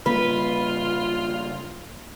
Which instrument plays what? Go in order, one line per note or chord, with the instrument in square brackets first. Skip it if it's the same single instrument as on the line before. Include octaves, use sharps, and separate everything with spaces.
[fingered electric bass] C#3 G3 A#3 [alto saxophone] F4 [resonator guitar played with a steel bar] B4